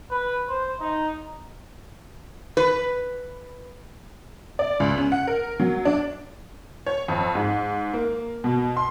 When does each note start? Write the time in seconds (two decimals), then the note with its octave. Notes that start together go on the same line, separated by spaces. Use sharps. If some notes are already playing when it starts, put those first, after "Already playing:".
0.11 B4
0.49 C5
0.81 D#4
2.57 B4
4.59 D5
4.80 C#2
4.98 C#4
5.12 F#5
5.27 A#4
5.60 F#3
5.85 D4
6.87 C#5
7.08 F2
7.35 G#2
7.94 A#3
8.44 B2
8.77 C6